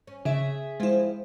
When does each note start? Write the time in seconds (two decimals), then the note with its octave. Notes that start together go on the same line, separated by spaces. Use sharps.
0.07 C#4
0.25 C#3 G#4 E5
0.80 F3 G#3 C4 E4 F4